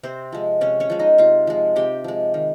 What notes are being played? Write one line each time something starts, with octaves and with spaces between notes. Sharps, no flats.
C3 C4 C5
F3 G#3
C3 C#4 C#5
C#4 C#5
F3 G#3
D#4 D#5
C3 F4 F5
F3 G#3
C3 G4 G5
F3 G#3
D#3